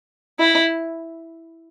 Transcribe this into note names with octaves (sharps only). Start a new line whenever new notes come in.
E4